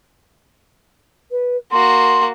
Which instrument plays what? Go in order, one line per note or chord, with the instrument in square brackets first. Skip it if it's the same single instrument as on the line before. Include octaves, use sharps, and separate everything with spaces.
[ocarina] B4
[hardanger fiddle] A#3 F#4 [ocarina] C6